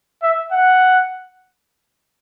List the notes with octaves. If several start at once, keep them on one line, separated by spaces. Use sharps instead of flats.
E5
F#5